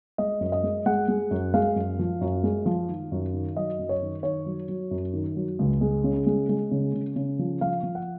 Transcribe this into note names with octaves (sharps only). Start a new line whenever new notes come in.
G#3 D#5
F#2
D#5
G#3
G#3 F#5
G#3
F#2
G#3 F5
F#2
F3
F#2
G#3
F3
D#3
F#2
D#3
F#3 D#5
F#2
C#5
D#3
D#3 C#5
F#3
F#3
F#2
D#3
F#3
C#2
G#3
C#3
G#3
G#3
C#3
C#3
C#3
F3
F3 F5
F3
F#5